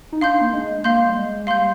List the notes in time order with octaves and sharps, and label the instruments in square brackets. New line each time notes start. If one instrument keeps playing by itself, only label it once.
[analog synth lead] D#4
[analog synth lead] D4 [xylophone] F5 C6 G6
[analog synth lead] A#3
G#3
[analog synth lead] A#3 [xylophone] F5 C6 G6
[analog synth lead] G3
G#3
[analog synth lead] G3 [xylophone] F5 C6 G6